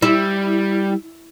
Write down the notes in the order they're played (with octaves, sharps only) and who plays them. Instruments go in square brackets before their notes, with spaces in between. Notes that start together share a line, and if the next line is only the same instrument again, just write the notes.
[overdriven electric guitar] G3 [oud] E4